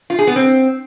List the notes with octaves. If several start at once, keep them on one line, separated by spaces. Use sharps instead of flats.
F4
G#4
B3
C4